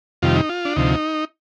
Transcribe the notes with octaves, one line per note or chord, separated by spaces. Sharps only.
F2 C3 D#3 G3 F4
D#4
F4
D4
D2 C3 F3 D#4